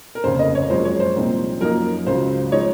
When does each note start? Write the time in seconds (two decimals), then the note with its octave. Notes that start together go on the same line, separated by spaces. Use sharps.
0.15 A#4
0.24 F1 D#2 C#3 C5
0.39 D#5
0.55 C#5
0.70 F#1 F#2 F3 G#3 C5
0.85 C#5
1.00 C5
1.16 C2 A#2 F3 C4 D#4
1.61 F#2 F3 A#3 D#4 A#4
2.07 C#2 C#3 F#3 C5
2.52 F3 G#3 D#4 C#5